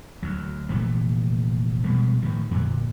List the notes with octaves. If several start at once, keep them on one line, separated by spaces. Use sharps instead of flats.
D2 F#3
F1 A#2 E3 A3
B2 F3 G3 G#3
A2 D#3 F3
F2 A#2 D3